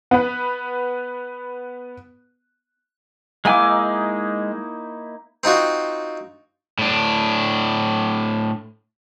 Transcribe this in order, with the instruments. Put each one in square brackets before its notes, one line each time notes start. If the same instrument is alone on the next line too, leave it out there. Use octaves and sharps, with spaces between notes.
[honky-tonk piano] B3 B4
[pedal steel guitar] G#3 G#5 D6 [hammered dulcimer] A#3 D#4 E4
[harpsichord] C4 D#4 F4 F#4
[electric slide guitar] A2 D4